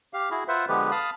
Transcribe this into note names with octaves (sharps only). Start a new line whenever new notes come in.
G4 F5
E4 F#4 G#4
F4 B4 C5 E5 F#5
D3 F3 G#3 B3 G4 B4
F5 A5 B5 D#6